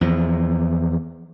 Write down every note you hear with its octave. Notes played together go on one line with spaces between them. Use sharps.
E2 F3